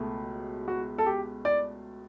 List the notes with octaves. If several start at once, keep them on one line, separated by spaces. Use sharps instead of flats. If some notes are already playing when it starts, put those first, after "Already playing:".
Already playing: C#2 B2 A3
F#4
A4
G4
D5